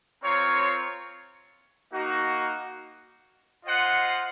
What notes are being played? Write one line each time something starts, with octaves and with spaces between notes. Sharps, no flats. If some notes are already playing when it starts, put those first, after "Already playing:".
C4 F4 A#4 C#5
A#3 D#4 F#4
F4 C5 D#5 F#5